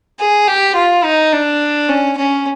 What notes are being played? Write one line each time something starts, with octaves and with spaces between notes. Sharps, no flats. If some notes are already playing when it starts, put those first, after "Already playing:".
G#4
G4
F4
D#4
D4
C#4
C#4